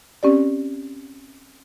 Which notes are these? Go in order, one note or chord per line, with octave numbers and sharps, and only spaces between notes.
C4 C#4 G4 D5